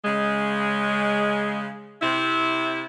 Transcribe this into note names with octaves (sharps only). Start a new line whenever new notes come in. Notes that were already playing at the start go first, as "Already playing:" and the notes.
C#3 G#3
C3 E4